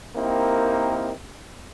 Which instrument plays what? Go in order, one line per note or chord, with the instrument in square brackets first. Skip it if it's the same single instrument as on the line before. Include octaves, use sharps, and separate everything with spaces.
[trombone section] A#3 C4 D#4 E4 G4 A#4